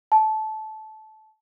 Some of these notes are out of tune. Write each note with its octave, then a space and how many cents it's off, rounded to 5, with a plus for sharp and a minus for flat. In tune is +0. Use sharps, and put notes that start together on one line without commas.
A5 -20